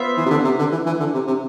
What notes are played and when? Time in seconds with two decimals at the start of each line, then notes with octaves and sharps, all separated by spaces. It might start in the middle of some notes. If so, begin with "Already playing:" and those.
Already playing: B3 F4 C5 E5
0.17 E3
0.26 C3
0.30 D3
0.44 C3
0.59 D3
0.72 E3
0.86 E3
1.00 D3
1.14 C3
1.27 C3